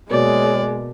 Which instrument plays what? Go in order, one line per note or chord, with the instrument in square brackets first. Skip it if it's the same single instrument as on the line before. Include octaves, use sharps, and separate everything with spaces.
[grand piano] B2 A#3 [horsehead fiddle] G#3 [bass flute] C#5 [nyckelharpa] D5